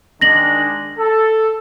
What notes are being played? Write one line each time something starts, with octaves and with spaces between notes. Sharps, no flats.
D#3 G#3 D4 A#6 F#7
A4